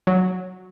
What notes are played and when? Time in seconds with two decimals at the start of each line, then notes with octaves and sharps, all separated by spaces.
0.07 F#3